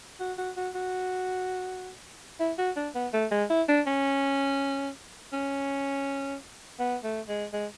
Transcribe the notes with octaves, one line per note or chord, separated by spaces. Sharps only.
F#4
F#4
F#4
F#4
E4
F#4
D4
B3
A3
G#3
E4
D4
C#4
C#4
B3
A3
G#3
G#3